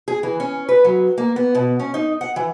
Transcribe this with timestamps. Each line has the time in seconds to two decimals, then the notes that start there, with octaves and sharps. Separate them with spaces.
0.08 G#4
0.23 E3
0.40 C#4
0.69 B4
0.85 F#3
1.18 A#3
1.36 B3
1.55 B2
1.79 C#4
1.94 D#4
2.21 F#5
2.36 E3